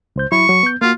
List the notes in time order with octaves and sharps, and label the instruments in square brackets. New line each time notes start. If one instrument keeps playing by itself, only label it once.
[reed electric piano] C#2 C5 G6
[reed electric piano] F#3 E4 B5 [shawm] C#6
[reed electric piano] F#3
B3 G6
[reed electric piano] A#3 F#4 [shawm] F4